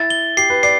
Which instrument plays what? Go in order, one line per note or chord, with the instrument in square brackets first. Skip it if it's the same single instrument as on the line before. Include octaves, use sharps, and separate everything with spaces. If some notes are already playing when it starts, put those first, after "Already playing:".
Already playing: [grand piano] E4 [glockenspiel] A6
[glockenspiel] G7
[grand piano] G4 [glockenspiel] C7
[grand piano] B4
[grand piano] D5 [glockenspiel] C7